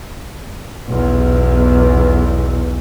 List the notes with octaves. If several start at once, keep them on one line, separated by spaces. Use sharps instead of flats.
B1 E2